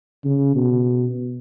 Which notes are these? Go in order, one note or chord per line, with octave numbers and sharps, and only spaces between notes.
C#3
B2